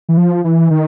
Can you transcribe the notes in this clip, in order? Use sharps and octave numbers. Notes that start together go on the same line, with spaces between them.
E3
F3
E3
D#3